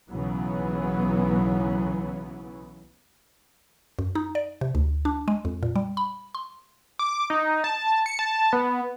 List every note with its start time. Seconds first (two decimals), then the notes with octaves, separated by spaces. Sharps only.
0.11 B1 C#3 E3 F#3 B3
3.99 F#2
4.15 D#4
4.35 D5
4.61 C3
4.75 D2
5.05 D4
5.28 G#3
5.45 F2
5.63 A#2
5.76 G3
5.97 B5
6.35 C6
6.99 D6
7.30 D#4
7.64 A5
8.06 C#7
8.19 A5
8.53 B3